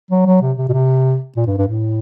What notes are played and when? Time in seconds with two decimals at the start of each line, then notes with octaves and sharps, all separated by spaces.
0.11 F#3
0.26 F#3
0.41 C3
0.57 C3
0.69 B2
0.73 C3
1.36 A#2
1.46 G2
1.58 G2
1.67 A2